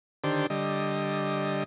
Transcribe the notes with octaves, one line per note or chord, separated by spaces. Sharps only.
D3 D#3 D4 G4 C5
D3 G3 D#5